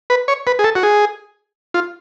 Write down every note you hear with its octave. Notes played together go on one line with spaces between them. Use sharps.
B4
C#5
B4
G#4
A4
F#4
G#4
F4